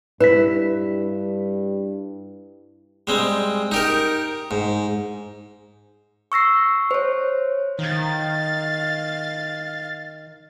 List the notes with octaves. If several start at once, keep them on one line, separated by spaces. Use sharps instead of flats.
G2 E4 B4 B6
G3 G#3 C4
D#4 G4 A#4
G#2
C#6 E6 A#6 C7
C5 C#5
D#3 F5 A6